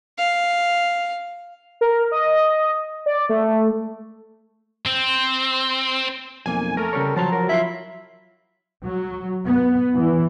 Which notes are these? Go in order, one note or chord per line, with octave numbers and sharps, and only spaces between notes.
F5
A#4
D#5
D5
A3
C4
B1 F2 A#3 G#5
A3 A4 A#4
C#3 G3 C#5
F3 F#3 C5 A5 A#5
A#4
E4 F4 E5 F5
F#3
B3
E3